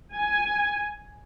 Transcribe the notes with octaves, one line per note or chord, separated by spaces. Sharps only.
G#5